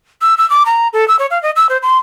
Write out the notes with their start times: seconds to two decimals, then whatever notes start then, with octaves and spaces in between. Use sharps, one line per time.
0.22 E6
0.38 E6
0.50 D6
0.66 A#5
0.93 A4
1.08 E6
1.19 C#5
1.31 F5
1.43 D#5
1.56 E6
1.69 C5
1.82 C6